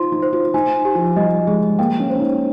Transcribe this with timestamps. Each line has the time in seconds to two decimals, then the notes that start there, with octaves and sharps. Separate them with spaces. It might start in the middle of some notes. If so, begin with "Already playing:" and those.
Already playing: D#4 F4 C5 C6
0.12 D#4
0.22 C5
0.33 F4
0.54 D#4 G#5
0.85 G4
0.95 F3
1.16 G3 D#5
1.47 G#3 G#4
1.79 A#3 G5
2.00 C#4
2.10 C#4 C5
2.20 D#4